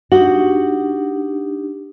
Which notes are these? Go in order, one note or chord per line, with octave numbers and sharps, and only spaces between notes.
D4 D#4 F#4 G4